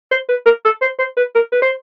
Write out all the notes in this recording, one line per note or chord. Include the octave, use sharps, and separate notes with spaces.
C5
B4
A#4
A4
C5
C5
B4
A#4
B4
C5